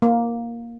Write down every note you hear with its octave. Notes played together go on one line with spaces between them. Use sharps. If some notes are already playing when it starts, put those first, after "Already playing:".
A#3